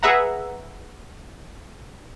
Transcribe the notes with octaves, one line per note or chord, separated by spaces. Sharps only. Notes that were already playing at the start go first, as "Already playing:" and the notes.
G#4 B4 E5 F#5 A#5